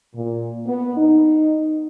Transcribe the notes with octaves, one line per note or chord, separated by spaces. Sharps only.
A#2
B3
D#4